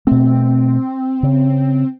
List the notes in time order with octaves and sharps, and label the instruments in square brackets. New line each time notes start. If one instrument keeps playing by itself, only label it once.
[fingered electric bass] B2 A3 [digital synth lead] C4
[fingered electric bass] C#3